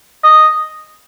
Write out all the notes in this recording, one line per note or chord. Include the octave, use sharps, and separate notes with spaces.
D#5